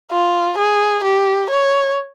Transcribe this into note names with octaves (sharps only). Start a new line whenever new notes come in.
F4
G#4
G4
C#5